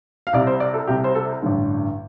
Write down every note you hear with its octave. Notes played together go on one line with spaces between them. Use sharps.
F5
C2 C3 D5
C5
D5
A4
C2 C3 G4
C5
A4
A1 G2 D3